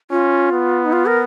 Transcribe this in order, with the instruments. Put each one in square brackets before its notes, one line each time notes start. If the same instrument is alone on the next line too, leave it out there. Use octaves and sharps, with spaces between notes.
[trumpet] C#4 [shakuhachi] F4
[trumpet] B3
[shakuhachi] D#4
F4
A#4